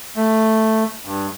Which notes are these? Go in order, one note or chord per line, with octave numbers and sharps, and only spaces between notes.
A3
G2